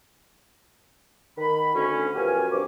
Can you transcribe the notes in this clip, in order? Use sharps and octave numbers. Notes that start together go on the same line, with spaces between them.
D#3 B5
D2 C#4
F#2 B2 F3 G4 F5 G#5
G2 B2 C4 A#4 C#5 D6